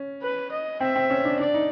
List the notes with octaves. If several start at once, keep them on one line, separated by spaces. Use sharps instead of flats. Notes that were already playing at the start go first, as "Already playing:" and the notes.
Already playing: C#4
B4
D#5
C4 E5
C4
C#4
D4
D4 D5
D#4